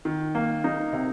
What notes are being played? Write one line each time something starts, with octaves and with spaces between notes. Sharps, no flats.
D#3
A#3
D#4
C3